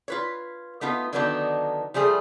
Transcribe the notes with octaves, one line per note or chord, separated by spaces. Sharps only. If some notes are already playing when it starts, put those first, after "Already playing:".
F4 B4 C#5
A3 B3 D#4 F4
D3 D#3 F#3 B3 D4 D#4
F3 G3 A3 G#4